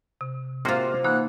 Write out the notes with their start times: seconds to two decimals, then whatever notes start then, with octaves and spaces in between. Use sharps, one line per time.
0.21 C3
0.65 C3 A#3 F4 F#4 C5 F6
1.04 E3 A#3 D#4 F#5